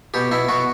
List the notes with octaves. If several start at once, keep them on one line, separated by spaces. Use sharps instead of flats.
B2 G4
B2 E4
B2 F#4